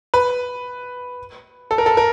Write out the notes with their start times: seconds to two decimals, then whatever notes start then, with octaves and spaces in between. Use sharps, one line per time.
0.14 B4
1.71 A4
1.78 A#4
1.86 A4
1.97 A#4